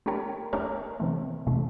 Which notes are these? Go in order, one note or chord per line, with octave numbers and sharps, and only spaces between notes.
A3 D4 G4 A#4 C#5
A3 D4 G4 A#4 C#5
C3 E3 A3
C3 E3 A3